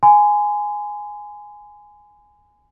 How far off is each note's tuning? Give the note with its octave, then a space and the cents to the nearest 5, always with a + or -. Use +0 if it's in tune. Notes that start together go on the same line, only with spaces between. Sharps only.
G#5 +0 C6 -40